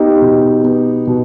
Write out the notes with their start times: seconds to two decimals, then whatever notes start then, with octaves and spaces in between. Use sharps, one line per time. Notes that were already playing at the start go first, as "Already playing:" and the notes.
Already playing: B3 D#4 G4
0.22 B2
0.64 B3
1.07 B2